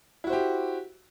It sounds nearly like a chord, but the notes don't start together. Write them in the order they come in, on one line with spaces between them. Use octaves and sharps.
E4 F#4 C5 G4